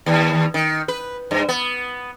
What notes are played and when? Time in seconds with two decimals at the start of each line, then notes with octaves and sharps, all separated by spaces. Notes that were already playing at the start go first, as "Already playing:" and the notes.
0.06 D#2
0.54 D#3
0.88 B4
1.31 G2
1.49 B3